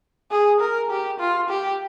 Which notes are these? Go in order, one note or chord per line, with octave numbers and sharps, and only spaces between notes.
G#4
A#4
G4
F4
G4